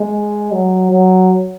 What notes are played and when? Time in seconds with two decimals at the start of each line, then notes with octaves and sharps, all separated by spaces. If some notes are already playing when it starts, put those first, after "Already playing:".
Already playing: G#3
0.52 F#3
0.91 F#3